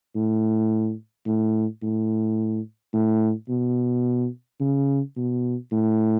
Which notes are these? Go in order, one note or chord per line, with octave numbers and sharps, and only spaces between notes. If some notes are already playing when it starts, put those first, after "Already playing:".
A2
A2
A2
A2
B2
C#3
B2
A2